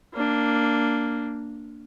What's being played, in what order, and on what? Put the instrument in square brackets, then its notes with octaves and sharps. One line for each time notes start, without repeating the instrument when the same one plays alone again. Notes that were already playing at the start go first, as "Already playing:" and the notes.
[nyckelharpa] A#3 D4